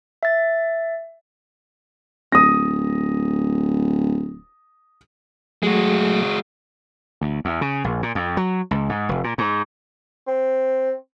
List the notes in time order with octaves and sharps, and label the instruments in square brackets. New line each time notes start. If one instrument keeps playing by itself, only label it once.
[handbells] E5 A6
[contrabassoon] D1 [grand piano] D#6 A#6
[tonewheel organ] F#3 A3 G#4 [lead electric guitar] G#3 F#4
[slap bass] D2
E2
C#3
A#1
A#2
F2
F#3
C#2
G#2
F1
A#2
G#2
[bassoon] C4